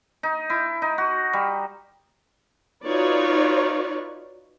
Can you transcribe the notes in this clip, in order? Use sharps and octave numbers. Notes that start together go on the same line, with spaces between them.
D#4
E4
D#4
F#4
G3
D#4 F4 F#4 B4 C#5 D5